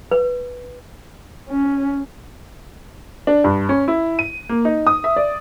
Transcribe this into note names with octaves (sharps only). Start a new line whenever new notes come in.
B4
C#4
D4
G2
C#4
E4
D#7
A#3
D#4
D#6
E5
D5